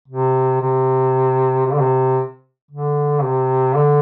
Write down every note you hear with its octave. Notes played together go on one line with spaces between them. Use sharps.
C3
C3
C3
D3
C3
D3
C3
D3